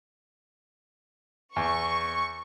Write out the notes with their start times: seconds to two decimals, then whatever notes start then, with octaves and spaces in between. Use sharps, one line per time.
1.56 E2 C#6